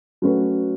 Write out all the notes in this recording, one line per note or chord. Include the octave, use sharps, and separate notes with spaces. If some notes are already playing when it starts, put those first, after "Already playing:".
F#3 A3 C#4 F#4 B4